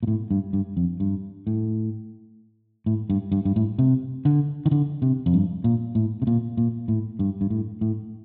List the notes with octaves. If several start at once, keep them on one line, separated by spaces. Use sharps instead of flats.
A#2
A2
G2
G2
F2
G2
A2
A2
G2
G2
G2
A2
C3
D3
D#3
D3
C3
F2
G2
A#2
A2
C3
A#2
A#2
A2
G2
G2
A2
A2